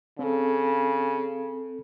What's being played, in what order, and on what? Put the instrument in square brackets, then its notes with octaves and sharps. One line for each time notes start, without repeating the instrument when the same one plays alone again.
[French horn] C#3 [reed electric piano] C4 A4